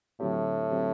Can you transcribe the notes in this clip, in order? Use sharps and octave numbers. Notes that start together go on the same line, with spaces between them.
A2 D3 F#3 C4 G4
D3 F#3 C4 G4